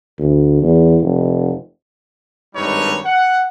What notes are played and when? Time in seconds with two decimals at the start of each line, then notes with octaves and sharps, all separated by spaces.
0.19 D2
0.63 E2
1.02 F1
2.55 G#1 G2 G3 D#4 B4 C#5
3.05 F#5